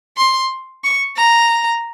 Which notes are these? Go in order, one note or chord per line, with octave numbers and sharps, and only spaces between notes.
C6
C#6
A#5